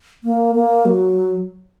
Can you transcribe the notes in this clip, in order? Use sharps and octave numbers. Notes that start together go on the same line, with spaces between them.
A#3
A#3
F#3